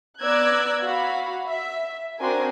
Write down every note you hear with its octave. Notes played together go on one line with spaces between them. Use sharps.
B3 D5 A#5 E6 F#6 G#6
F#4 F5 B5
E5
C4 D4 F#4 A#4 G#5 C6